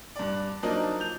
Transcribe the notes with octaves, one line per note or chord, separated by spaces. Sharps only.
G2 D5
F3 F#3 A#3 D4 D#4 D#5
G6 F7